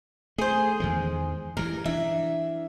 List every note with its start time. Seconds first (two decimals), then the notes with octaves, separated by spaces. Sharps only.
0.38 A3 G#4 C5
0.80 E2 D#3 G#3
1.57 G2 E3 A#4
1.86 E3 D4 E5